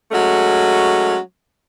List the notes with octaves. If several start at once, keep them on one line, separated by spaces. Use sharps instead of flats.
F#3 G#3 A3 C#4